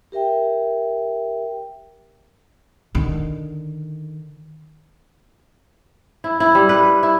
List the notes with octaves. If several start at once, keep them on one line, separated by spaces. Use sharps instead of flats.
G4 A#4 E5 G5
D3 D#3
E4
E4
G3
B4
E4